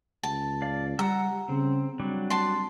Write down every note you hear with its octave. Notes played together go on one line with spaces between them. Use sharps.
C#2 A5
D5 F5
G3 F#5 A#5 E6
C#3 C4
F#3 G3 C4 D4
A5 C6